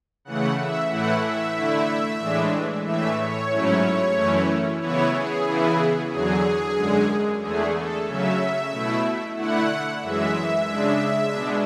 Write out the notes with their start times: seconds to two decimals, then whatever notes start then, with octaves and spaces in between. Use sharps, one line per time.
0.25 C#3 E3 A3 F#5
0.57 E5
0.90 A2 E3 A3 E4 F#5
1.23 E5
1.55 D3 A3 E4
2.20 A2 E3 G#3 D4
2.85 A2 E3 A3 E5
3.18 C#5
3.51 G#2 F#3 A3 C#4 E4
4.15 F#2 E3 A3 C#4 E4
4.80 C#3 E3 B3 E4 C#5
5.13 G#4
5.46 C#3 E3 B3 E4
6.11 E2 D3 F#3 G#4
6.76 F#2 D3 G#3
7.41 E2 D3 A3 G#4
7.74 A4
8.06 C#3 F#3 C#4 E5
8.72 B2 A3 E4
9.36 D3 A3 E4 F#5
10.01 F#2 E3 G#3 E5
10.67 C#3 G#3 D4
11.32 B2 G#3 D4